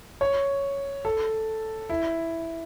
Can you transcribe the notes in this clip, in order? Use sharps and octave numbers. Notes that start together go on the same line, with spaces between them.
C#5
A4
E4